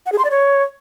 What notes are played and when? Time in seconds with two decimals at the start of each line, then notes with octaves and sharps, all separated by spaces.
0.06 F#5
0.12 G#4
0.18 C6
0.25 D5
0.31 C#5